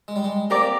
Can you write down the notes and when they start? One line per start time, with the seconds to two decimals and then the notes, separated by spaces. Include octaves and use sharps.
0.08 G#3
0.16 G3
0.24 G#3
0.50 A#3 C4 G4 A#4 D5